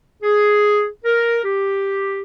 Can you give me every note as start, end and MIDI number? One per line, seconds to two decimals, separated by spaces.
0.22 0.86 68
1.05 1.38 70
1.43 2.23 67